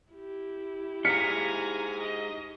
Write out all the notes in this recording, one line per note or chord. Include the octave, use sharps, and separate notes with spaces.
E4 G4
D#4 G#4 F5 G#5 A#5 F6 B6 C#7
D#5